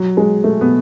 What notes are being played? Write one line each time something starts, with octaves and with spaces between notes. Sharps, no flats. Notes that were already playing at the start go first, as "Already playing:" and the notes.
Already playing: F#3
G#3
A3
B3